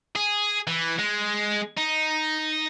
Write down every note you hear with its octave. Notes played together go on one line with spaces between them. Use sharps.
G#4
E3
G#3
D#4